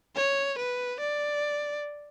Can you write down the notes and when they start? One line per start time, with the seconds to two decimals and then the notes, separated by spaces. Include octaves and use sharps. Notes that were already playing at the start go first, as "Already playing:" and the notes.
0.16 C#5
0.58 B4
1.00 D5